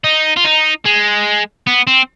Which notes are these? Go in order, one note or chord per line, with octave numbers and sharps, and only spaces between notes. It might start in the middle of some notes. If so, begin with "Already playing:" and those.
D#4
F4
D#4
G#3
B3
C4